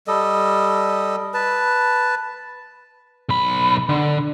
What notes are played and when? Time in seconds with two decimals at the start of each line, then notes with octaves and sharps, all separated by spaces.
0.07 G3 A4 D#5
1.34 B4 A5
3.29 B1 B5
3.89 D3